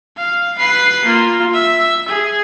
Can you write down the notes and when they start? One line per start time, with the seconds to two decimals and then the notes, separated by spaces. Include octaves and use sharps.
0.17 F5
0.59 B4 C7
1.05 A#3 F4
1.54 E5
2.08 G#4